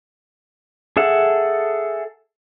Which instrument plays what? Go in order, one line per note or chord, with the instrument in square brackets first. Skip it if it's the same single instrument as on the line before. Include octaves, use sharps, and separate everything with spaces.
[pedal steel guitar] G#4 A4 E5 F#5